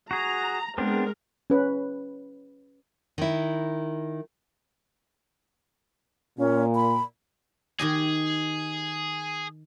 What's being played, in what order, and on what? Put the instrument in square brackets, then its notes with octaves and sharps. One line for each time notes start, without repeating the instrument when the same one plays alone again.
[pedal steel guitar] F#4 G#4 [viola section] A#5
[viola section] G#3 A#4 [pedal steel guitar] B3 C4 D4
[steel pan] C#4 B4
[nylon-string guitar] D#3 E4
[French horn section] A#2 [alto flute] C#4
[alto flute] B5
[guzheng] D#3 G4 D#5 [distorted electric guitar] G#4